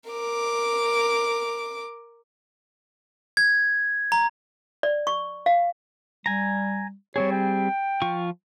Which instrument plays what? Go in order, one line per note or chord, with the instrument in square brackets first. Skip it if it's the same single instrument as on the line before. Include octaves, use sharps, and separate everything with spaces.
[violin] A#4 D6
[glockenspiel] G#6
A#5
[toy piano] D5
C#6
F5
[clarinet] G3 [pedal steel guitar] G#5 A#5
[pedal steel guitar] G3 C4 G#4 [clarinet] C#5
[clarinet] G5
[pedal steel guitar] F3 F4 C#6